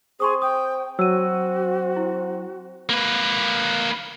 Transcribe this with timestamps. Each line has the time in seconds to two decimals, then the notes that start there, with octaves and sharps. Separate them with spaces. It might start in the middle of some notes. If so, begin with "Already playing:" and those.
0.20 C4 G#4 C6 C#6 D#6
0.42 G5 D#6
0.99 F#3 C4 F#4 E6 D#7
1.96 E4
2.89 A#3 B4